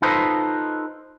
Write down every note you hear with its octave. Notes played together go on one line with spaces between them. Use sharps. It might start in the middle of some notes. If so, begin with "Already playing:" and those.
D#4 F4 A4 B4 C5 D#5